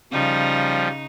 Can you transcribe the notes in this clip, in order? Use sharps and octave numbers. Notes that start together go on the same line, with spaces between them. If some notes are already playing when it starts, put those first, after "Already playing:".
C#3 F3 G3 D#4